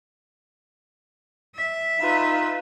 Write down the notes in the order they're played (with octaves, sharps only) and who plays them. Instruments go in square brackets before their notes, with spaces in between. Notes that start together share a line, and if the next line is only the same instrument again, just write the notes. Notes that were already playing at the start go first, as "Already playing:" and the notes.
[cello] E5
[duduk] D#4 [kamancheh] F4 B4